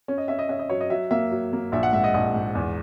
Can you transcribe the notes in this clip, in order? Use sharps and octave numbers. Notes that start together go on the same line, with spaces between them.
C#4
D#5
C#4 E5
D#5
C#4 E5
D#5
F#3 C#5
D#5
F#3 E5
A#3 E5
F#3
A#3
A#1 E5
F#5
G#2 E5
D#5
A#1 D#5
G#2
E2